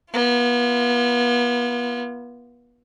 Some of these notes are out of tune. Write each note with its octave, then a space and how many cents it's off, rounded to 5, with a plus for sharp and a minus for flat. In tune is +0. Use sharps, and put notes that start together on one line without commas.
B3 -35 F4 -25